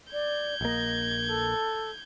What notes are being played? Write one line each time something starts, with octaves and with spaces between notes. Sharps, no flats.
D5 G6 G#6
A#1 A#3 D#5
A4